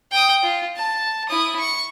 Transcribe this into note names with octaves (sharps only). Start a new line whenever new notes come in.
G5 D#6
F4
A5
E4 D#6
C#6